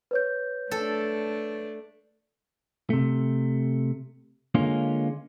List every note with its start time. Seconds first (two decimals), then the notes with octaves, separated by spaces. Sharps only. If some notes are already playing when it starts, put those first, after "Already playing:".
0.11 B4 C#5 G6
0.71 A3 D4 A4
2.90 C3 A3
4.55 D3 G#3 A#3 C#4 F4